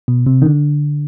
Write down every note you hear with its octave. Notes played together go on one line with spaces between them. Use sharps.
B2
C3
D#3
D3